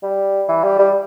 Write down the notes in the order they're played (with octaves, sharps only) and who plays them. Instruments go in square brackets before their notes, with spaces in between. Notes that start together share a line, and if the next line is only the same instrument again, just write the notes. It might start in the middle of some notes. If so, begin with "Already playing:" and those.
[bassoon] G3
E3
G3
G3